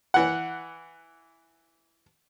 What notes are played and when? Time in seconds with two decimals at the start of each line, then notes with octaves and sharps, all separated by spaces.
0.14 E3 F#5